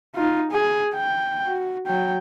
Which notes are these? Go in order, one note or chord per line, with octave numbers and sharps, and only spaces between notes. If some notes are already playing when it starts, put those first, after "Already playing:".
D#4 F4
G#4
G5
F#4
F#3 G5